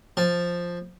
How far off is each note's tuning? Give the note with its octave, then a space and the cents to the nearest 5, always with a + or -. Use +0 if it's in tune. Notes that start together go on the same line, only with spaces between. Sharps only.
F3 +0 A5 +0